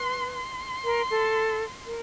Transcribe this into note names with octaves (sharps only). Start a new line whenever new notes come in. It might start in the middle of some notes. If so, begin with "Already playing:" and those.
Already playing: B4 C6
C6
A#4
A4
A#4